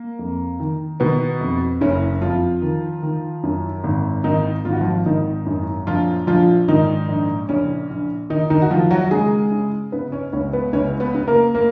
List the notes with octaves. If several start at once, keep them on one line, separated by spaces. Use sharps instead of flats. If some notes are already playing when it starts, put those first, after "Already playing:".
Already playing: A#3
F2
D#3
B2 D#3 B3
F2
F#1 C#3 C#4
F2 F3 F4
D#3
D#3
F#2
G#1
G#1 D#3 D#4
G#1 F4
F#4
F3 F4
G#1 D#3 D#4
F#2
A#1 F3 F4
A#1 F3 F4
G#2 D#3 D#4
A#1
A#1 C#3 C#4
A#1
D#3 D#4
D#3 D#4
F#4
D#3 F3 F4
F#3 F#4
C#3 G#3 G#4
C#3
C#3 B3 B4
C#4 C#5
C#2 C#4 C#5
B3 B4
C#2 C#4 C#5
B3 B4
C#3
A#3 A#4
A#3 A#4